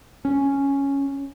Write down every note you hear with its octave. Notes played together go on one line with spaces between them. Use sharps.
C#4